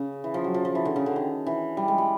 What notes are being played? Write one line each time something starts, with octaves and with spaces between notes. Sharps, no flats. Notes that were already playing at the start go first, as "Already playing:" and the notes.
Already playing: C#3
E3
F3
F#3
F3
F3
E3
D3
C#3
D3
D#3
E3
G3
G#3
G3